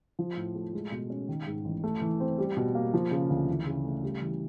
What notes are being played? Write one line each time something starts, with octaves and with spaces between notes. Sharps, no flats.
F3
A2
A3
G#3
B2
C#4
D#3
G#2
A1
A3
E3
C4
G3
B2
A#3
F3
C#3
D2
E3
C#3
A3
G3
E3